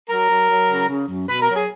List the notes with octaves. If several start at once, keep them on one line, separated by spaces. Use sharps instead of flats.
F#3 A#4
F#3
F#3
C#3
C#3
F#2
B2 B4
A#4
F#3
G#4